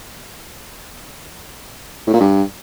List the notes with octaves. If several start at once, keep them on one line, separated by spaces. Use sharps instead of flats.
A2
A#2
G2